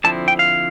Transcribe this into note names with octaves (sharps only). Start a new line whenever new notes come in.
D3 F3 C4 E4 A5
G5
F5